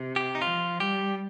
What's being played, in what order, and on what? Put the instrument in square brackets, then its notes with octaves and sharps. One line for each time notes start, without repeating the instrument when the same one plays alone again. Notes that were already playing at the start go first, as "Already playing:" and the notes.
Already playing: [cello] C3
[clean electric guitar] G4
D#4
[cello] F3 [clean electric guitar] F4
[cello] G3 [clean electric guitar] G4